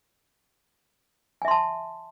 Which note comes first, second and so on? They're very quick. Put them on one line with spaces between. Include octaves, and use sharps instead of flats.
G#5 E5 C6 A5